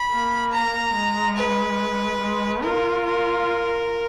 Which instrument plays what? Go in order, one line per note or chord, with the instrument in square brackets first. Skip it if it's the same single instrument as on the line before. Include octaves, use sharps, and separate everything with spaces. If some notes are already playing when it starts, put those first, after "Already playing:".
Already playing: [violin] B5
[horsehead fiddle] A#3
[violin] A#5
[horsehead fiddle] G#3
[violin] B4
[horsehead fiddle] G#3
[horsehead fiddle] F4 [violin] A#4
[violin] A#4